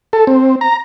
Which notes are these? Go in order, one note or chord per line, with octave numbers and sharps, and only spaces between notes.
A4
C4
A#5